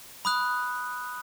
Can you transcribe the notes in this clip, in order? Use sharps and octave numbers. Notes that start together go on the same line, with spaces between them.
B5 D#6 F#6